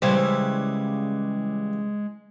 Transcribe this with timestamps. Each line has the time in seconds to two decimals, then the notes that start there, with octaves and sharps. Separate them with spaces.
0.02 C#3 E3 G3 G#3 C5